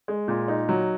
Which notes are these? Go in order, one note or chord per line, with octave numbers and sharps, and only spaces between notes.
G#3
A#2
D#4
F#3